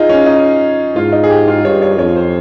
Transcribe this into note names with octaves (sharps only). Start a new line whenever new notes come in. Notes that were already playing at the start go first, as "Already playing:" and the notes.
Already playing: D#4 F4 G#4
C#4
D#4
G#2 F4
D#4
G#4
G4
F4
G2 C#5
C#5
F2 C#5
C5